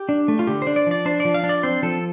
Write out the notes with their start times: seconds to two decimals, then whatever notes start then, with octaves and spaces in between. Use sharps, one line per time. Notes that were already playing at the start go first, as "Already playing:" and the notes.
Already playing: G4
0.09 D4
0.28 A3
0.39 F4
0.47 D3 G4
0.62 D4 C5
0.76 D5
0.86 F3 D5
1.06 D4 C5
1.20 F3 D5
1.34 F5
1.43 D4
1.49 D5
1.63 C4 C5
1.83 F3 A4